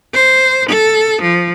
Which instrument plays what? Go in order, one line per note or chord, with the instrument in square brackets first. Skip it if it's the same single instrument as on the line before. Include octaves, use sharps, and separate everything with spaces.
[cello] C5
A4
F3